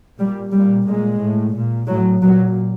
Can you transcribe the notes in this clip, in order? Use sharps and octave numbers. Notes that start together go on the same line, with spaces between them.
A#2 G3
A#2 G3
A#2 G#3
A2
A#2
A2 F#3
A#2 F#3